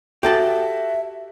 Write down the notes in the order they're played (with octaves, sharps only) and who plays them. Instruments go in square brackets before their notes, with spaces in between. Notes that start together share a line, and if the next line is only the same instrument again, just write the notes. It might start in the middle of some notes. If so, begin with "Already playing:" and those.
[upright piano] F#4 [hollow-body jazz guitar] G4 A4 A5 [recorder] E5